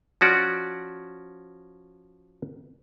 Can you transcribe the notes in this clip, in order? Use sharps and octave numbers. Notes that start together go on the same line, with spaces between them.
F3 C#4 F#4 D5